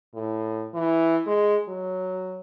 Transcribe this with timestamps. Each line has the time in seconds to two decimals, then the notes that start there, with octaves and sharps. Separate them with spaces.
0.14 A2
0.74 E3
1.26 G#3
1.68 F#3